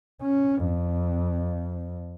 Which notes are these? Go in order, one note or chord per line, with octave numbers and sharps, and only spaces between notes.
C#4
F2